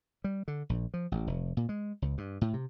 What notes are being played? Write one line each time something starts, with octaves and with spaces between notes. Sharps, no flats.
G3
D3
A#1
F3
A1
F1
A#2
G#3
C#2
G2
A2
C3